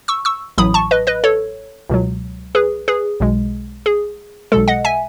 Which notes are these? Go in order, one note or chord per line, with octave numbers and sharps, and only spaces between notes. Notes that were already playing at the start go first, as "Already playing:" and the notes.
C#6 E6
C#6 E6
A1 A2 F#3 B5 D#6
A5 C#6
B4 D#5
B4 D#5
A4 C#5
C#2 B2 F#3
G#4 B4
G#4 B4
B1 B2 G#3
G#4
B1 B2 G#3 A4
D#5 F#5
E5 G#5